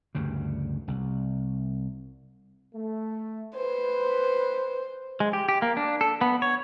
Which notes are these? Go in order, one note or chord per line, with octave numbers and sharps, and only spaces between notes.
D2 G2 C#3
C2
A3
B4 C5
G#3
G4
G4
A#3
D4
A4
B3
C#5